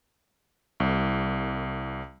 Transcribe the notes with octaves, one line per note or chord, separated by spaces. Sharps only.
C2